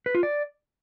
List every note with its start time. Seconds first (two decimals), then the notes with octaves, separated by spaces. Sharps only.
0.06 B4
0.15 F4
0.23 D5